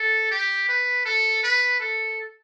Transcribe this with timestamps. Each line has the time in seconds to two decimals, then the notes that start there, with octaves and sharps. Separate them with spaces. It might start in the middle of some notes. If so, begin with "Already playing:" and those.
Already playing: A4
0.31 G4
0.69 B4
1.05 A4
1.43 B4
1.80 A4